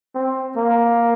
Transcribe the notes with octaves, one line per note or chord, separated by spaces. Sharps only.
C4
A#3